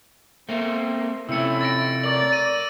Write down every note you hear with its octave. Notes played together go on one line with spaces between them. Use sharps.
A3 A#3 C4
C3 A3 C#4 E4 E6 C#7
A6 A#6 D7
A#4 C#5 D5 F#7
D#7